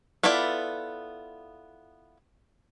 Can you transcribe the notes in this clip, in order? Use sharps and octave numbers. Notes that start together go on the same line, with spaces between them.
B3 E4 F4 A4 D5